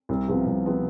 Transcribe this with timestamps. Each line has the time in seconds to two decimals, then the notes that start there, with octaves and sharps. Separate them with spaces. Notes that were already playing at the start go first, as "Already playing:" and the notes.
0.09 C2
0.28 C3 F3 B3
0.46 C2
0.66 C3 F3 B3